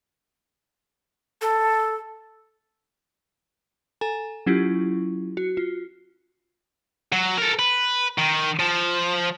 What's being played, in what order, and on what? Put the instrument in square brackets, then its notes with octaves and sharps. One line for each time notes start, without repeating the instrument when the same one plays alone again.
[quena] A4
[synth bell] A4 G#5 A#5
F#3 C#4 E4 F4 G4
F#4
F4
[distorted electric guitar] F#3
A4 A#4
B4
D#3
F3